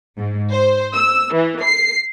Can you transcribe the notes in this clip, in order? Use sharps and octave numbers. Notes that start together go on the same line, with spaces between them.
G#2
C5
E6
E3
C7